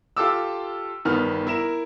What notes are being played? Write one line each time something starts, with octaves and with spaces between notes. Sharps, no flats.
F4 G4 A4 D6 E6
G1 D#3 B3 F6
E4 A#4 E7